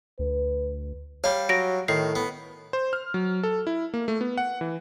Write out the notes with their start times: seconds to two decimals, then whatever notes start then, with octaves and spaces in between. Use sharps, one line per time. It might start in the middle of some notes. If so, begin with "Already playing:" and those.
0.19 D2 B4
1.24 G3 C#5 F5
1.49 F#3 A#6 D7
1.88 A2 D#3 C7
2.15 B3
2.73 C5
2.93 F6
3.14 F#3
3.43 A4
3.67 E4
3.94 A#3
4.08 A3
4.21 B3
4.38 F#5
4.61 E3